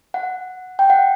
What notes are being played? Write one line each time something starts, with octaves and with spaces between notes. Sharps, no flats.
F#5
G5
F#5